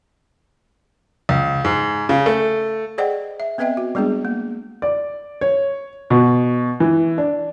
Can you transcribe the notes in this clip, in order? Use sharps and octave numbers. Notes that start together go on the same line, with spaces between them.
C#2
G#2
C#3
A3
G#4 C5 D5 D#5 F#5 G5
E5
B3 C4 B4 D#5 E5 G5
F#4
G3 G#3 B3 D4 G#4
A#3
D5
C#5
B2
E3
D4